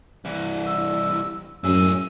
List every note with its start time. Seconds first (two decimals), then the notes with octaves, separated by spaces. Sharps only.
0.25 C2 E3
0.66 E6
1.64 F#2 A2 G#4 E6